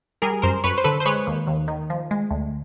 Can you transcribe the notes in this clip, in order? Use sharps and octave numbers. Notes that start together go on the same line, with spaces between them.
G3 G#4 A#4
F#2 A#4 C5
F#2 B4 C#5
C5
D3 A4 B4
C5
G#3 B4 C#5
D#2
D#2
D#3
F3
G#3
D2